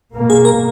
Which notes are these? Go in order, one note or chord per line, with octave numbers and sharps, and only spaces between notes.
B2 A#3
G#4
A#4